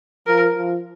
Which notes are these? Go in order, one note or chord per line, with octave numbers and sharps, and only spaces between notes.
F3 A#4
F3